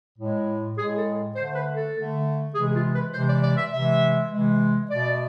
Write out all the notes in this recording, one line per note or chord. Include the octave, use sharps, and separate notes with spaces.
A2 G#3
A2 G#3 G#4
A4
D3 A3 C5
B4
A4
D3 A3
C3 E3 G#3 G#4
F4
B4
C3 E3 G#3 C5
D5
D5
E5
C3 E3 G#3 E5
C3 E3 G#3
B2 A3 D5